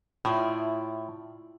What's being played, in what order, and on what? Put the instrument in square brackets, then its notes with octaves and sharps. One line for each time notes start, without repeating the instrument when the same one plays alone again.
[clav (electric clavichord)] A2 [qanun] E4 F4 D5